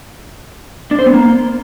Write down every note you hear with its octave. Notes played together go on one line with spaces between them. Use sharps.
D4
C5
B3
A#3